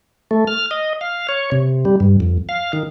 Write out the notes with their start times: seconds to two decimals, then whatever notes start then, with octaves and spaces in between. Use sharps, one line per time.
0.31 A3
0.47 F6
0.71 D#5
1.01 F5
1.29 C#5
1.52 C3
1.85 G3
2.00 G2
2.20 F2
2.49 F5
2.73 D#3